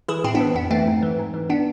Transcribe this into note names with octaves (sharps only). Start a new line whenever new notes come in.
E3 E4 G#4
A2 C4 E4
B3 D4
E3
F2 B3
E3 A3 C4
G#2
E3
G#2
E3
B3 D4